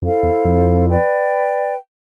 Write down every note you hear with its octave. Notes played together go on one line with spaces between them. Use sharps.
F2 E4 A4 C5 F5
E2
F2
B4 D5 G5